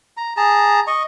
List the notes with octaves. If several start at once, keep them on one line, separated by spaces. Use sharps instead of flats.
A#5
G#4 A5 A#5
D#5 C#6